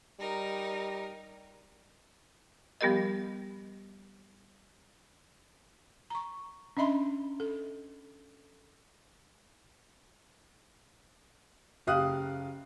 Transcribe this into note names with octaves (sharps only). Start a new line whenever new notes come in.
G3 D#4 A#4
F3 G3 B3 G4 A#4 D#5
A#5 C#6
C#4 D4 D#5 E5 B5 C6
A4
F#1 G4 F5 D#6 F#6